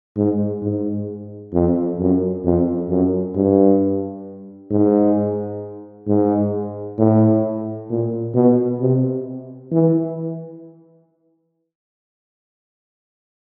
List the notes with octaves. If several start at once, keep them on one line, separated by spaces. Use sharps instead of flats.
G#2
G#2
F2
F#2
F2
F#2
G2
G#2
G#2
A2
A#2
B2
C3
E3